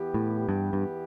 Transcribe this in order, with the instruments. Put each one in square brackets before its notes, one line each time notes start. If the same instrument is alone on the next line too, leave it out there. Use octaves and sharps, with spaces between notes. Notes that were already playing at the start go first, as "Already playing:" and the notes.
Already playing: [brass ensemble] E2 E3 B3 G4
[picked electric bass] A2
G2
G2